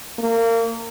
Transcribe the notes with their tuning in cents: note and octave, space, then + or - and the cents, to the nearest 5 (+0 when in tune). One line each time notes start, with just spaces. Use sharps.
A#3 -30